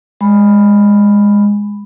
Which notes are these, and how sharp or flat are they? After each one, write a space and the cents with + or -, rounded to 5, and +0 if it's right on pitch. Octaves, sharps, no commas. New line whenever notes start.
G#3 -15 B5 +0